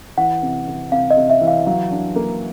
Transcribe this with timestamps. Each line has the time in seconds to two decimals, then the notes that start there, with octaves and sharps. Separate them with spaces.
0.18 E3 F#5
0.43 C3
0.68 C3
0.92 C3 F5
1.11 D#5
1.17 C3
1.30 E5
1.41 E3
1.47 F5
1.67 F#3 F5
1.91 D4
2.16 A#3